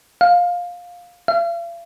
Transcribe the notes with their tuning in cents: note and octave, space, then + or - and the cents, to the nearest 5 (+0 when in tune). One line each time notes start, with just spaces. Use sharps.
F5 +15
F5 -45